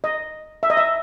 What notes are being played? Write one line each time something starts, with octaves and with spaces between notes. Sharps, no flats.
D#5
E5
D#5
E5